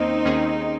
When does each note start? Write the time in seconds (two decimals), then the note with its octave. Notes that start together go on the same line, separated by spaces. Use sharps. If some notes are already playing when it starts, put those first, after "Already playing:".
Already playing: D#2 D#3 A#3 C4 C#4 D#4
0.25 D#2 D#3 A#3 C#4 G#4